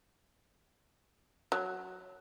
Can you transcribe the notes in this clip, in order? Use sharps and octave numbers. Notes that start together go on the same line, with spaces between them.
F#3